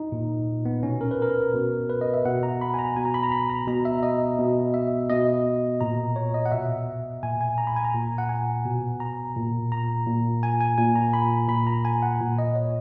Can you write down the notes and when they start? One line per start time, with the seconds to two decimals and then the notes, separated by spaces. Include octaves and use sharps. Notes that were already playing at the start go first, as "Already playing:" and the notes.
Already playing: D#4
0.12 A#2
0.65 B3
0.83 B2 C#4
1.01 A#4
1.11 B4
1.22 A#4
1.54 B2
1.90 B4
2.01 D#5
2.14 E5
2.25 B2 F#5
2.43 A#5
2.61 B5
2.74 G#5
2.79 A#5
2.96 B2 G#5
3.05 A#5
3.14 B5
3.23 A#5
3.32 B5
3.50 A#5
3.67 B2 A#5
3.85 E5
4.03 D#5
4.39 B2
4.74 E5
5.10 B2 D#5
5.81 A#2 A#5
6.16 C#5
6.34 D#5
6.46 F#5
6.52 B2 E5
7.23 A#2 G#5
7.41 G#5
7.58 A#5
7.67 B5
7.76 G#5
7.85 A#5
7.94 A#2
8.18 F#5
8.29 G#5
8.65 B2
9.00 A#5
9.36 A#2
9.72 A#5
10.07 A#2
10.43 G#5
10.60 G#5
10.78 A#2 G#5
10.95 A#5
11.13 B5
11.49 A#2 B5
11.67 A#5
11.85 G#5
12.02 F#5
12.21 A#2
12.38 D#5
12.55 C#5